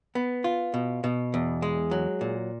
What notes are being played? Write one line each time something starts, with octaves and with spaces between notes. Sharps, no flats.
B3
F4
B2
B2
E2
G#3
F#3
A#2